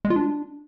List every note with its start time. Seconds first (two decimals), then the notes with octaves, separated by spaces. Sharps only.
0.05 G#3
0.10 F4
0.16 D4